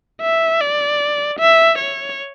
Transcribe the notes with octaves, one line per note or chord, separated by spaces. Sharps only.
E5
D5
E5
C#5